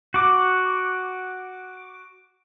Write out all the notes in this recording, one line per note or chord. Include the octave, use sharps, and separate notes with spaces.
F#4 D6